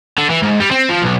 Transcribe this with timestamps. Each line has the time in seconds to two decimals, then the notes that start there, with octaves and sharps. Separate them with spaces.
0.18 D3
0.30 E3
0.42 G#2
0.60 G3
0.71 C4
0.89 F3
1.02 B1